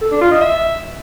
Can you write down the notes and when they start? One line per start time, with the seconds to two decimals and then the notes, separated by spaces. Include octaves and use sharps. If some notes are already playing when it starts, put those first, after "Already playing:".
0.02 A4
0.11 D4
0.21 F4
0.31 D#5
0.41 E5